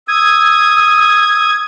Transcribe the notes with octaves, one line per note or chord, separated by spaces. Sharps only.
D#6 E6 G#6